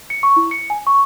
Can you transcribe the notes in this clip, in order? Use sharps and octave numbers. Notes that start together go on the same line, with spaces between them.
C#7
C#6
E4
C#7
G#5
C#6